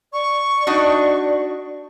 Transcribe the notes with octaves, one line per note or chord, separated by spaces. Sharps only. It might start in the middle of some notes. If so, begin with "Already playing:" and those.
D5 C#6
D4 D#4 F#4